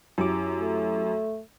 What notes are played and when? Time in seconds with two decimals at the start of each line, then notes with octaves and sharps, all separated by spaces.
0.18 F#2 E4 G4 D6
0.61 A3